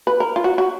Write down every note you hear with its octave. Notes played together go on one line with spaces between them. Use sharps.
B4
A#4
F4
F#4
F#4